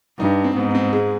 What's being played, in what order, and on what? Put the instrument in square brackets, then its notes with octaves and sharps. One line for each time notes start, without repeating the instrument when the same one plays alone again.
[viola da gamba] G2 [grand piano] D#4
[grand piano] C4
[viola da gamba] G#2 [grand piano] B3
[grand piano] C4
G#3